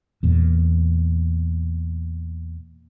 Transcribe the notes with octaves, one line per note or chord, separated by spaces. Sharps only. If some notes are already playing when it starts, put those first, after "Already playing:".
E2 A#2